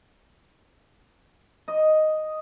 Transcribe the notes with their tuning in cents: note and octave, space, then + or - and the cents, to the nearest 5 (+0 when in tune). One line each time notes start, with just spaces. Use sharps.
D#5 +0